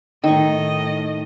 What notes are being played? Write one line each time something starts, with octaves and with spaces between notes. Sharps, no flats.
A2 D#3 D#5 C#6